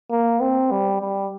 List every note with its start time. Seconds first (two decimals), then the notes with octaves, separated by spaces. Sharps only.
0.11 A#3
0.40 C4
0.71 G3
1.01 G3